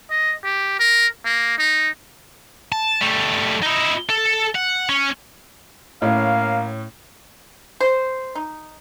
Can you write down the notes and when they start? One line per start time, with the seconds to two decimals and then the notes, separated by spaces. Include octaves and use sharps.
0.10 D#5
0.44 G4
0.79 A#4
1.25 A#3
1.58 D#4
2.72 A5
3.01 G3 A3
3.62 D#4 E4
4.09 A4
4.55 F#5
4.89 C#4
6.02 A2 A#3 C#4 F5
7.80 C5
8.35 D#4